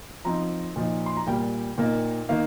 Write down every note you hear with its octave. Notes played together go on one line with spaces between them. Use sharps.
F3 C4 D#4 A#5
A#2 F3 D#4
C6
A#5
A#2 G3 A#3 G5
A#2 A#3 D#4
D#3 A#3 D#4 F5